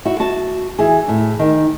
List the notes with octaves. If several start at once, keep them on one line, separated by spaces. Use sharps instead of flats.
E4 F#4
F#4 A5
E3 G#4
A2
D#3